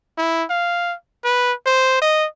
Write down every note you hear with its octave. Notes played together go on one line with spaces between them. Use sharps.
E4
F5
B4
C5
D#5